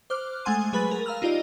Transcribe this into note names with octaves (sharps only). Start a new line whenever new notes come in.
C5 D6 F6 F#6
G#3 A3 F#5 G#5 C6 D#7
F#3 G#4 B4 B5 F#6 A6
A#4
F5 A#5 E6 F6
D#4 F4 G4 D5 D#5